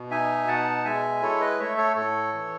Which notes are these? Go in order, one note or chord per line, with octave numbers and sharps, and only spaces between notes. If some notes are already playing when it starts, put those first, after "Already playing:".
Already playing: B2
D#4 E5 G#5
B2 F#5 A5
G#3 E5 G#5
E4 A4 C#5
B4 D#5
A3 C#5 E5
A4 C#5
A2 A4 C#5
E3